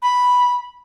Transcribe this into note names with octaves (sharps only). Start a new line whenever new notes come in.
B5